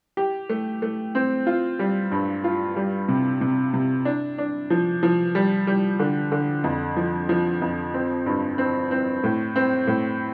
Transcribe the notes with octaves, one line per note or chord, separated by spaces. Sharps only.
G4
A3
A3
C4
F4
G3
G2
F4
G3
C3
C3
C3
D4
D4
F3
F3
G3
G3
D3
D3
F2
F3
F3
F2
C4
G2
C4
C4
A2
C4
A2